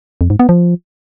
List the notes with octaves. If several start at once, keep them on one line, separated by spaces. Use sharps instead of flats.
F2
G#2
B3
F3